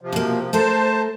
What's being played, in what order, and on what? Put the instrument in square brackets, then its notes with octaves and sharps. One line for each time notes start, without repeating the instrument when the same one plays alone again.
[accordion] C3 F3
[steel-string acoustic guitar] B2 A#3
[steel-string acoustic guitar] A3 A4 A#4 [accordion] C5 A5